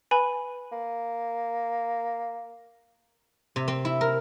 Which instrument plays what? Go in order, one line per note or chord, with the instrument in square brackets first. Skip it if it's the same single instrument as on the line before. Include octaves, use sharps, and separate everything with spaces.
[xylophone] B4 G#5 B5
[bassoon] A#3
[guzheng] C3
C4
E4
A#4